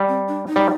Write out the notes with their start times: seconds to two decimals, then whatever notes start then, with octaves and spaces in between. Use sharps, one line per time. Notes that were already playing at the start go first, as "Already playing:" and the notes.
Already playing: G3
0.09 C4
0.28 D4
0.48 D#4
0.56 G3